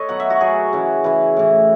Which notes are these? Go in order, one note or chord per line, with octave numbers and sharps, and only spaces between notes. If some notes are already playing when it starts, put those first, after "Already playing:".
Already playing: A4 B4 C#5 D#5
B2 F#3 F#5
E5
F#4
B2 F#3 G#4
C#3 E3
C#3 E3 B4
A2 E3